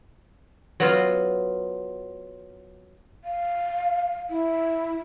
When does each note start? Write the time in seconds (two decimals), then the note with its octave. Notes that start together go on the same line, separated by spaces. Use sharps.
0.80 F#3 B3 F4
3.24 F5
4.30 E4